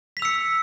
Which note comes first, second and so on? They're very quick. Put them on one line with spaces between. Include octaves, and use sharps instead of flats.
B6 F7 E6 C#7